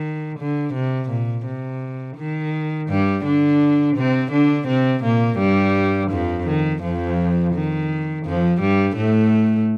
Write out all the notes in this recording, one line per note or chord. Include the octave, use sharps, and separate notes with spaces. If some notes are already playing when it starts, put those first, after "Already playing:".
Already playing: D#3
D3
C3
A#2
C3
D#3
G2 G3
D3 D4
C3 C4
D3 D4
C3 C4
A#2 A#3
G2 G3
F2 F3
D#3
F2 F3
D#3
F2 F3
G2 G3
A2 A3